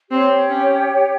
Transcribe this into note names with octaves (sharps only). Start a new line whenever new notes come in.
C4 G4 C#5 G5
C#4